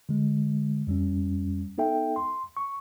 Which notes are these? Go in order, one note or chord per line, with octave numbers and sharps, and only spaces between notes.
D3 G#3
F2 G3 C#4
B3 D#4 A4 E5 G5
C6
C#6